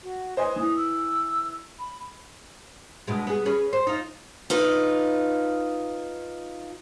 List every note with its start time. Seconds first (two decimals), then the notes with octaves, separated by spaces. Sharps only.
0.03 F#4
0.37 B4 C5 D#5 G#5
0.56 E3 D#6
0.76 E6
1.79 B5
3.07 G2 B2 G#3
3.27 B3 G#4
3.45 C#4 G#4 B4
3.73 C5
3.87 D#4 F4
4.50 D#4 F4 B4